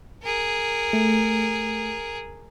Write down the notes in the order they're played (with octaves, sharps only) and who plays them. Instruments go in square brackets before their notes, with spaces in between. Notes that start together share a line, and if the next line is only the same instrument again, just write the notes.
[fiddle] G#4 A#4
[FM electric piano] A3